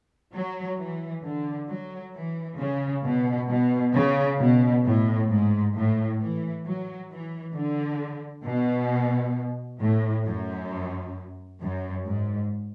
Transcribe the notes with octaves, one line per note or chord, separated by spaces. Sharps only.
F#3
E3
D3
F#3
E3
C#3
B2
B2
C#3
B2
A2
G#2
A2
E3
F#3
E3
D3
B2
A2
F#2
F#2
G#2